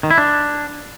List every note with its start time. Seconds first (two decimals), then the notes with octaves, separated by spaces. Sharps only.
0.03 D#3
0.11 E4
0.18 D4